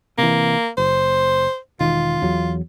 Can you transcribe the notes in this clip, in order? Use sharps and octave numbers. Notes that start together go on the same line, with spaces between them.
C3 E3 A#3
F#1 C5
E1 D#3 F4
E2 F#3